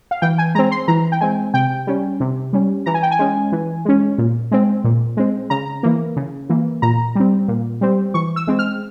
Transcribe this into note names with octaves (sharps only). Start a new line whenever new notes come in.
F5
E3 G5
G#5
G#3 C4 A#5
C6
E3 A#5
G5
G#3 C4 G#5
C3 G5
G3 C#4
C3
G3 C#4
E3 A#5
G#5
G5
G#5
G#3 C#4
E3
G#3 C#4
A#2
G#3 C4
A#2
G#3 C4
C#3 A#5
E3 A#3
C#3
E3 A#3
A#2 A#5
G3 C4
A#2
G3 C4
E3 C#6
E6
G#3 C4
F6